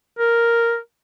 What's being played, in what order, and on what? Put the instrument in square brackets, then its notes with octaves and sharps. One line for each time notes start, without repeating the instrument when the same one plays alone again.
[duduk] A#4